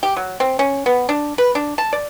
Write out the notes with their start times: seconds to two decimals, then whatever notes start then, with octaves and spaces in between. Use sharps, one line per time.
0.03 G4
0.16 F#3
0.40 C4
0.59 C#4
0.86 B3
1.09 D4
1.38 B4
1.55 D4
1.78 A5
1.93 D5